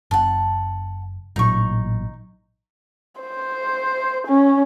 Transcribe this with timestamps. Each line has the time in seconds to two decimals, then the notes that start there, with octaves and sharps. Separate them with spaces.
0.11 F#1 F#5 A5
1.36 A1 A#2 F#3 D#4 C#6
3.21 C5
4.27 C#4